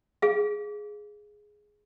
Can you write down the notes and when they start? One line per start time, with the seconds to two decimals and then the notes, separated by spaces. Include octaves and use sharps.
0.22 G#4 F5